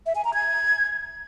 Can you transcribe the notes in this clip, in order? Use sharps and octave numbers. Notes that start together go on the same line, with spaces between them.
E5
G#5
A#5
G#6